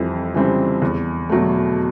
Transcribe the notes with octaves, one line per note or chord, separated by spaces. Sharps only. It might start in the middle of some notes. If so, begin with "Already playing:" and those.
Already playing: F2 E3 G3 C4
C#3 E3 G3 C4
E2
B2 F#3 A3